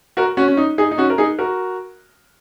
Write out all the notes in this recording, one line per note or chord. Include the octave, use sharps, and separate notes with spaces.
F#4 A#4
C#4 F#4
C#4
D#4
D#4 G#4
D#4
C#4 F#4
A#4
D#4 G#4
F#4 A#4